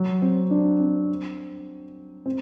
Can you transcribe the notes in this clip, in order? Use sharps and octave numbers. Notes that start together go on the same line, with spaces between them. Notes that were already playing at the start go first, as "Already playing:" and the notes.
Already playing: F#3
C4
D4
C4
C4